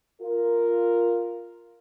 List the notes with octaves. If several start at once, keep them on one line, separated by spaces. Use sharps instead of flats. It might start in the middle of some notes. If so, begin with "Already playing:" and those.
F4 A#4